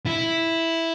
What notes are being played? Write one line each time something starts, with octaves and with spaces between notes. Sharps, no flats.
E4